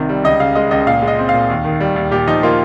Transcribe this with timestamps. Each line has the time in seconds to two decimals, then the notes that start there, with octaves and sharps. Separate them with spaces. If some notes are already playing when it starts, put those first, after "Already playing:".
Already playing: C2 C3 D#3
0.09 G3
0.24 C#2 D#5
0.40 C#3 F5
0.55 G#3 D#5
0.71 C#2 D#5
0.87 A#2 F5
1.02 G#3
1.08 D#5
1.19 C4
1.29 F5
1.34 A#2
1.50 D#2
1.65 D#3
1.80 G3
1.96 D#2
2.11 A#2 G4
2.27 F3 D#4
2.43 A#3 F4